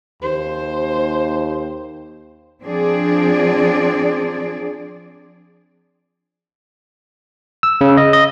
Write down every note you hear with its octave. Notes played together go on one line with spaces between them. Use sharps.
D#2 C5
F3 C4 D4 G#4 D5
E6
C#3
D#5
D#5